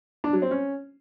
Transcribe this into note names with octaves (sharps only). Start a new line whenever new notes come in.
D4
F#3
C4
C#4